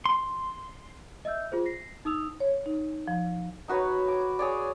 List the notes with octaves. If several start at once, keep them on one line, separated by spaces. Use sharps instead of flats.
C6
D#5 E5 E6 G6
F4 G#4 C5
A#6 C7
D#4 D#6 E6 F7
C#5
D#4
F3
D#4 F#4 B4 C#5
D6
G#4 C#5 D5